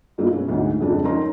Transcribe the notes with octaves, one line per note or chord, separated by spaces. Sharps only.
G2 G#3 A#3 E4
B2 C#4
D2 G#2
F2 C#3 G#3 D4
C#4 D#4 A#4 D#5 A#5 C6